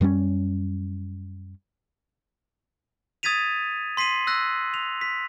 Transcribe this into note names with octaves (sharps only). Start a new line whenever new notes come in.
F#2 G3 B3 C#4
D#6 G#6 A6 B6 D#7 F7
C6 B6 C7 D#7 F#7
E6 F#6 A#6
F7
B6